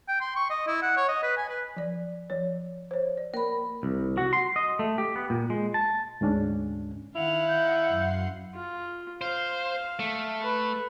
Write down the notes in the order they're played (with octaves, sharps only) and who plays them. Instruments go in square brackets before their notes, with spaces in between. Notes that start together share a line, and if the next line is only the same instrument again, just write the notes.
[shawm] G5
C6
C#6
D#5
E4
F#5
C#5
D#5
B4
G#5
B4
[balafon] F3 D5
F3 C#5
C5 C#5
D5
[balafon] A#3 [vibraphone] A#4 B5
[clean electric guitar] C2
F#4
C6
D#5
A3
G4
B3
A#2
G#3
A5
[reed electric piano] D2 G#2 C#4 D4
[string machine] D#3 [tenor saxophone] E4 [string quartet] F5 F#5 [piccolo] F7
[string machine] D#5 A#5 [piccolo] G6
[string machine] F#2 C6 C7
[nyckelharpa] F4
[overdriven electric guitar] C5 [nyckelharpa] F5
[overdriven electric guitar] A3
[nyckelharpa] B4